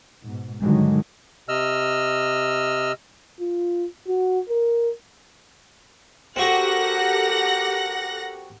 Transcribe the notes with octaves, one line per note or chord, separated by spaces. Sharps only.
G#2 B2
G2 D3 D#3 F#3 G#3
C3 D#5 E6 F6
F4
F#4
A#4
C4 F#4 G4 A4 A#4 F#5 A#6